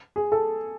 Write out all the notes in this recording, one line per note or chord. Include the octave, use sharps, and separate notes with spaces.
G#4
A4